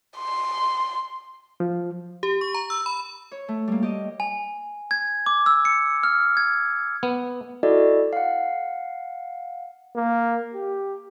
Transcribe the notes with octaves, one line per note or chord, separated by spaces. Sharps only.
C6
F3
G4
C#6
A#5
E6
B5
C#5
A3
G3 A#3
G4 D#5
G#5
G#6
D6
E6
C#7
F6
G#6
B3
E4 F#4 A4 D5 D#5
F5 F#5
A#3
G4